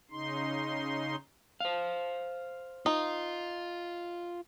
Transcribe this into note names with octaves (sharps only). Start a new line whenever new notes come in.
C#3 D#4 C6
C5 F5
D#4 F4